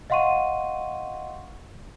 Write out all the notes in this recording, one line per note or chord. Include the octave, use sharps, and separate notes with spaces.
D#5 F5 F#5 C6 C#6 D#7